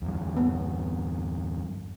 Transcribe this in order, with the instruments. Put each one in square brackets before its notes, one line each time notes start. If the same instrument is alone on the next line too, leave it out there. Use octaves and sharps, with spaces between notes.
[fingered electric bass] E2 G2
[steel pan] B3